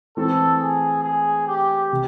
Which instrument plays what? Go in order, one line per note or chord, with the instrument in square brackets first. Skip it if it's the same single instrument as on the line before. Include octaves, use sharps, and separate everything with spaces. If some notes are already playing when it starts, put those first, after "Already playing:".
[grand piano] E3 A3 C4 [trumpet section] A4
[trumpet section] G#4
G#4
G4
[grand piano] C3